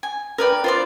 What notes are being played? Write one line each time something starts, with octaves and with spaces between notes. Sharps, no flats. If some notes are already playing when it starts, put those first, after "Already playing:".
G#5
A#4 B4 D5 G5
F4 C5 D5